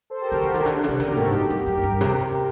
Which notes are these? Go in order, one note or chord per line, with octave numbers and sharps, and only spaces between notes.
A4 C5
G4 A#4
D3 F#4 A4
D3
D#3
C3
D3
C3
D3
C3
D3 G4 A#4
C3 F#4 A4
A2
G2 C4 D#4
F#2 D#4 G4
F#2
F#2 G4 A#4
G2
C3